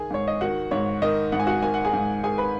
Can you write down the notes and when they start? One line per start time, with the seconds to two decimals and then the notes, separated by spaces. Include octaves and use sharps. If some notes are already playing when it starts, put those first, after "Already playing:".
Already playing: D#3 G#4 G#5
0.11 G#2 C#5
0.28 D#5
0.41 D#3 F#4 F#5
0.71 G#2 C#5
1.02 D#3 D#5
1.32 G#2 F#5
1.40 G#5
1.47 F#4 F#5
1.62 D#3 G#5
1.74 F#5
1.85 G#4 G#5
1.94 G#2
2.23 D#3 G#4 G#5
2.38 B4 B5